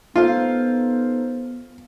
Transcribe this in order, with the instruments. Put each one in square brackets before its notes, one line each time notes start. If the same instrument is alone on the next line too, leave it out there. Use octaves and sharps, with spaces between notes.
[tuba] B3 [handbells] D#4 A4 C5 [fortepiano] F4 F5